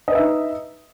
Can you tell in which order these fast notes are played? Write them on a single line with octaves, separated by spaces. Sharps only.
D#5 B4 E5 D#4